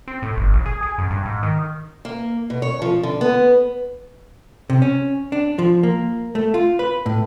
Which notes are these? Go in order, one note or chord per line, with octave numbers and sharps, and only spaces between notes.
C4
A2
G1
A#1
G#4
G#4
F#2
G2
G#2
D#3
A#3
B2
C#5
F3
D3
B3
C3
C#4
D4
F3
A#3
A3
F4
B4
A2